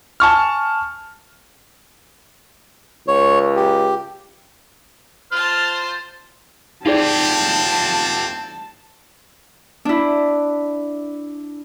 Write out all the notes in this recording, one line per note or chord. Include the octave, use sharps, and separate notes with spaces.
G#5 A5 C#6 F6
C#2 C#5
G4
F4 C5 A5 F6
C4 D#4 F4 G4 G#4 D5 A5
D4 E4